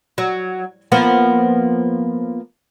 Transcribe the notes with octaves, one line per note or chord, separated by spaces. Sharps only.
F#3
F3 A#3 B3